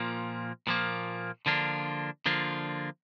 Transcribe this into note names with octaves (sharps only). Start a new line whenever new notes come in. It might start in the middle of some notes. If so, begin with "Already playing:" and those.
Already playing: A#2 F3 A#3
A#2 F3 A#3
D3 F3 A#3 D4 F4
D3 F3 A#3 D4 F4